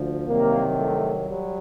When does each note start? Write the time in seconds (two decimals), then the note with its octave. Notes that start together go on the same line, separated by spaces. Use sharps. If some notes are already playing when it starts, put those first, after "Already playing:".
Already playing: D2 F3
0.27 C2 C3 D#3 F#3 A#3
0.78 A3
1.29 F#3 G3